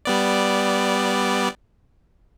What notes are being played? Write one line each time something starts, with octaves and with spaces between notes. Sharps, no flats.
G3 B3 D5